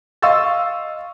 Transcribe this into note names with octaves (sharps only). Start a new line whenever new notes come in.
D#5 F5 C6 C#6 E6 A6